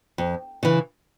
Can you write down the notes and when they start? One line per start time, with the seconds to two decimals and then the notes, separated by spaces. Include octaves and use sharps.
0.18 F2
0.63 C#3 E3